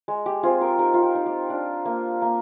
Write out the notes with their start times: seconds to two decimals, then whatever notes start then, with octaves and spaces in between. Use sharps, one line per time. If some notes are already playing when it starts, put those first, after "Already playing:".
0.08 G#3
0.26 G4
0.43 C4 F4 G#4
0.61 G4 A#4
0.79 D#4 G4 A#4
0.94 F4
1.03 G4
1.15 D#4
1.26 G4
1.50 D4 F4
1.85 A#3
2.22 A#3